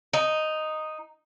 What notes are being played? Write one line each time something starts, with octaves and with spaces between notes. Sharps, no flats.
D#4